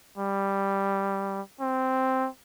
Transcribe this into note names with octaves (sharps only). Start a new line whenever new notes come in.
G3
C4